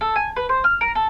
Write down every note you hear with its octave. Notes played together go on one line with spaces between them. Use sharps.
A4
G#5
B4
C5
F6
A#4
A4